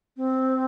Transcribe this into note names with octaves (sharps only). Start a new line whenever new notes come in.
C4